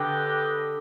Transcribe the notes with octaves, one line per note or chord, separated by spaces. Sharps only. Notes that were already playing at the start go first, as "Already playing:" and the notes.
Already playing: D3 D4 G4 B4 D#5 G5